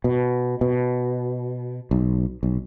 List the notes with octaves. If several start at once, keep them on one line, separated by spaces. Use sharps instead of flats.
B2
B2
B1
B1